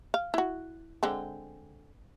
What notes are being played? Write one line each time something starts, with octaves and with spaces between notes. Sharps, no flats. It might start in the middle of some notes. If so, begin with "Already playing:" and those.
F5
E4 F#4
D3 G#3 C4